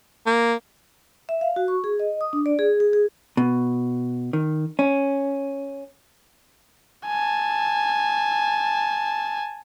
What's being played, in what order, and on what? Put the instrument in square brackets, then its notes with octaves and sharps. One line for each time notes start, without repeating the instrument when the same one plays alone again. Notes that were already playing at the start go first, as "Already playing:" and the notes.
[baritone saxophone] A#3
[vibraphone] E5
F5
F#4
C#6
G#4
D#5
D#6
D4
D5
G#4
G#4
G#4
[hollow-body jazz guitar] B2
D#3
C#4
[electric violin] G#5 A5